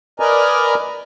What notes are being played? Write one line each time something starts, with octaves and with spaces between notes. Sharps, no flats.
A#4 B4 D5 D#5 G#5 A#5